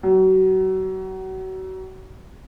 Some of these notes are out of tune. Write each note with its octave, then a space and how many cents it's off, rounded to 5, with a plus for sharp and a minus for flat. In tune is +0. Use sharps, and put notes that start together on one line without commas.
F#3 +30